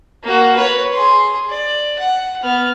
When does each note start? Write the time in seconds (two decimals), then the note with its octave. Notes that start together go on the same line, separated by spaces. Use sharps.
0.23 A#3 F#4
0.56 B4 C#5
0.93 G#4 C6
1.50 D5
1.99 F#5
2.43 B3 F6